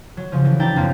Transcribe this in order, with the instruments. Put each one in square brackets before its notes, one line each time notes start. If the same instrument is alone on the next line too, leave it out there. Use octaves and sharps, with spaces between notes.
[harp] F#3
C#3 F3
A2 E3
D4 E4 G5 A#5 A6
F#2 B2 F3 A#3 C4 D4